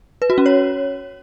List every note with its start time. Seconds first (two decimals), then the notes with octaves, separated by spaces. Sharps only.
0.22 B4
0.30 F#4
0.38 C#4
0.46 C#5